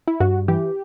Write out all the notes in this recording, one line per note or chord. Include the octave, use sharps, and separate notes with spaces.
E4
G2 F#4
E3 G4